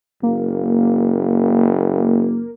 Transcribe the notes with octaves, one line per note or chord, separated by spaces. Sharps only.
F#1 A#3